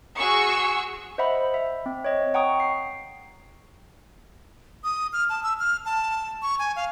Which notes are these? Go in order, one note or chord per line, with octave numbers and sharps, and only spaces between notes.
F#4 G#4 C#6 E6 C#7
C5 D#5 E5 F#5 B5
E5
C4
C#5 D#5
F#5 G5 A#5 C#6 D#6
C7
D#6
F6
A5
E6
F6
A5
C#6
G#5
F5